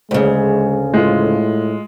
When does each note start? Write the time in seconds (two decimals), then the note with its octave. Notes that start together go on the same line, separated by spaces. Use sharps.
0.11 D2 C#3 G#3
0.94 A2 G#3 F4